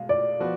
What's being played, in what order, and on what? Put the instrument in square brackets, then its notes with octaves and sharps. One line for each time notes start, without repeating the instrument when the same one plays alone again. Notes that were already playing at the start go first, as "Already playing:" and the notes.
Already playing: [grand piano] B2 G#3 [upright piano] F5
[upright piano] D5
[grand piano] F3 B3 F#4